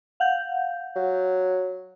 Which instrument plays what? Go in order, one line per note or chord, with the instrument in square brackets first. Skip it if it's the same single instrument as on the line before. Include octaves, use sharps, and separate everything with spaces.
[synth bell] F5 F#5 G6
[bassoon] F#3